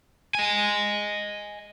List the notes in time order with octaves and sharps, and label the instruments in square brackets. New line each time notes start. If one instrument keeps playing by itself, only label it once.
[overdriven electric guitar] D#5 G#5